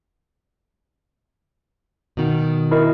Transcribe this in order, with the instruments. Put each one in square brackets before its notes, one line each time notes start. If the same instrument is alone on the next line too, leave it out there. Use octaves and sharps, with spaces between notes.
[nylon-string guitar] B2 D#3
[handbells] E4 A#4 D#5